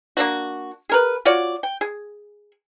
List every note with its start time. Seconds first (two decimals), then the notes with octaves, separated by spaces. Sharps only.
0.17 A#3 D4 F#4
0.89 G#4 A#4 B4
1.25 F4 F#4 C#5 D5
1.63 G5
1.81 G#4